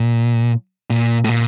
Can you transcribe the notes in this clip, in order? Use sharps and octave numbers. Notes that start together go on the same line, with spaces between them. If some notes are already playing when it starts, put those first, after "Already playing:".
Already playing: A#2
A#2
A2
A#2